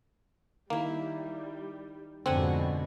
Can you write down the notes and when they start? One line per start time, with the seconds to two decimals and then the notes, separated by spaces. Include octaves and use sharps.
0.70 D#3 G3 A#3 E4
2.26 F2 G#2 B2 D3 C4 F#5 G#5